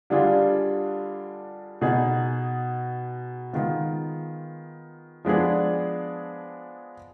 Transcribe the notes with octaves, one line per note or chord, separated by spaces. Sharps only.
D3 G3 D4 F4 G#4
B2 B3 D#4 G#4
D#3 G#3 B3 F4
F3 G#3 B3 D4 G#4